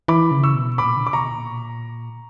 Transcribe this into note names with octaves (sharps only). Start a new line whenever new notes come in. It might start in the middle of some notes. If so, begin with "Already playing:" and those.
E3 B5 D6
C#3
C#6 E6
B2
A#2 B5 D6
D3
D6
B2 A#5 C#6
A#2